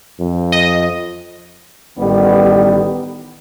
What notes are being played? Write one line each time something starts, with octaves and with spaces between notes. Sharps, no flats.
F2
D#5
A1 D#3 G3 B3